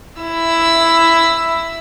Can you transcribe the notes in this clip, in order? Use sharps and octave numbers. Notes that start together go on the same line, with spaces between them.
E4 E6